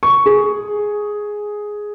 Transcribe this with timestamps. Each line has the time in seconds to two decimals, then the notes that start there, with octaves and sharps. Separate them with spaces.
0.03 C#6
0.26 G#4